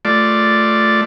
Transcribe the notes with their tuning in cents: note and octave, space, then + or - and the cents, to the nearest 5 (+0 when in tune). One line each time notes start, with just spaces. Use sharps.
A3 +0 F4 +0 D5 +0